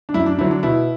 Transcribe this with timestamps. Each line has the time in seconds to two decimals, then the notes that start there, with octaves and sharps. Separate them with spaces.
0.09 D4
0.14 F#2 E4
0.26 D4
0.38 D3 F#3 E4
0.51 D4
0.63 B2 E4